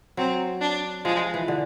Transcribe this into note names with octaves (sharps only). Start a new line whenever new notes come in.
F#3 C4
D4
F3 G#3
E3
D3